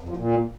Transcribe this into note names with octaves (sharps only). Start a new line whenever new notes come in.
F2
F3
A#2